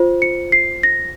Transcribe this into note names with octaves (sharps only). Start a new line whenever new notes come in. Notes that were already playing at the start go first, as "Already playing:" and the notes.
Already playing: F4 C5
C#7
C7
A#6